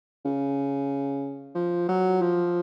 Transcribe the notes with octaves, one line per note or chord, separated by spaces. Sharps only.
C#3
F3
F#3
F3